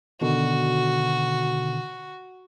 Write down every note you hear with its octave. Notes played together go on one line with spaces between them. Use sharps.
B2 D3 D#3 F#4